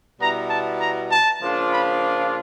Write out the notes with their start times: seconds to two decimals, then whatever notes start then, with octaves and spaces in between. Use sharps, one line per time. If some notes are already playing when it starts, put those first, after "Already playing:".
0.19 B2 G3 B3 E4 A#5
0.49 A5
0.80 A#5
1.11 A5
1.41 C#3 F3 A#3 D4 F4
1.71 B5